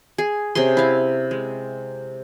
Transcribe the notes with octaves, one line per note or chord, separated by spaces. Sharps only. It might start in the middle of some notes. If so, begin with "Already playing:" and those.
G#4
C3 C#4 G#4 C6
E4 F5
G#3